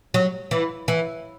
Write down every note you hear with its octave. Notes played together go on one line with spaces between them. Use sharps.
F#3
E3
E3